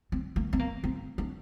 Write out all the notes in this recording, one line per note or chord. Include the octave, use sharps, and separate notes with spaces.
C4
A#3
C4
A#3
C4
D4